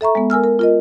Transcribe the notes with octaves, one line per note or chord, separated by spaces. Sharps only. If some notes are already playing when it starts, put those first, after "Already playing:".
A4 E5 A#5 C#6
G#3 B3
A#4 G#5 E6 F6
A#4
F4 A#4 D#5